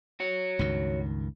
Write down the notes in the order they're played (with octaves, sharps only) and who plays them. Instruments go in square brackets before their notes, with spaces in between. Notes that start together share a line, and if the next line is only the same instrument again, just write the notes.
[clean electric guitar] F#4 C#5
[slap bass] C#2 G2 D#3